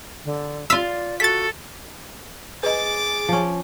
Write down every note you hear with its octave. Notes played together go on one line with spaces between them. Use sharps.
D3
F4 D5 F5 E6 B6
F#4 A4 A6 B6
G#4 B4 D#5 D6 A6
F3 C#4